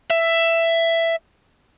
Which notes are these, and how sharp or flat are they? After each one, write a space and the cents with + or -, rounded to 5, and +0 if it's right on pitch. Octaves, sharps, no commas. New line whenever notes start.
E5 +10